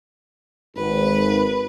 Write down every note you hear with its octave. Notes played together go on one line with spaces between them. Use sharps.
G#1 B4